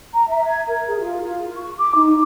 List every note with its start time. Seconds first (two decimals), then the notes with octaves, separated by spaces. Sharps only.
0.14 A#5
0.28 E5
0.44 G#6
0.68 A#4
0.87 G#4
0.99 F4
1.23 F4
1.55 C#6
1.78 D6
1.94 D#4